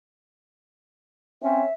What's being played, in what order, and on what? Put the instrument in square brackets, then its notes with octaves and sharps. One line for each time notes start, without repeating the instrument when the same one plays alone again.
[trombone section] C4 C#4 [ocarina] E5